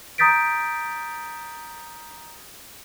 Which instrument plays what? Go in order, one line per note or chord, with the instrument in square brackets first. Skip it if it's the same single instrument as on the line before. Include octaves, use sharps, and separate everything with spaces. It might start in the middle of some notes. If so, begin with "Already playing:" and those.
[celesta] A#5 D#6 G6 A6 B6 D7